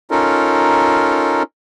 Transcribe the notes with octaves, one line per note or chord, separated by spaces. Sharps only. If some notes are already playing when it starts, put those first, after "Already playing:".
C#4 D#4 F4 A4 A#4